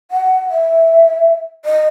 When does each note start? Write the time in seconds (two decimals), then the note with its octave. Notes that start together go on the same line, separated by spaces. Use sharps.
0.11 F#5
0.50 E5
1.65 D#5